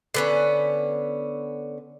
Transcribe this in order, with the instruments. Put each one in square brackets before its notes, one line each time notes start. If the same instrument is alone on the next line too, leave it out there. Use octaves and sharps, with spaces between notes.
[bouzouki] D3 B3 C#4